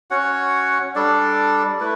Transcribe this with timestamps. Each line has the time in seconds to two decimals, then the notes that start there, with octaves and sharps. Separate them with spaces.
0.11 C#4 F#4 C#5 F#5
0.95 G3 D4 A4 D5
1.80 A3 E4 B4